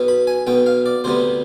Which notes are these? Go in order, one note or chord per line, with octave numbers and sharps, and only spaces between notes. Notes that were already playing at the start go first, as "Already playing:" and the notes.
Already playing: B1 B2 B3
B5
G#5
B1 B2 B3 G5
F5
D5
D2 C3 G3 B3 C5